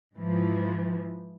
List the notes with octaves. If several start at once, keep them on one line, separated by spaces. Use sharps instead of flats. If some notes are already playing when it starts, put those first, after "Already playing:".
G#2 E3 F3